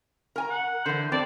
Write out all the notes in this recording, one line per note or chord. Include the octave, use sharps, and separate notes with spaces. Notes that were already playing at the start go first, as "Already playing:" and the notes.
A#4 G#5 A#5
F#5
D3 E3 C5
F2 C4 D5 A5